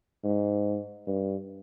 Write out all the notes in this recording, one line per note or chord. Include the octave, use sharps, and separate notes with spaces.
G#2
G2